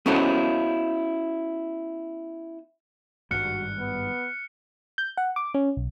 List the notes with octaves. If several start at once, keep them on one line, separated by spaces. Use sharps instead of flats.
B3 C#4 E4 F#4 A4 C5
G#1 G2 G3 F#4 F6 F#6 C#7
B3
G6
F#5
D6
C#4
B1